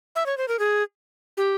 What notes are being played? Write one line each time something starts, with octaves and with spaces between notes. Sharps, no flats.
E5
C#5
C5
A#4
G#4
G4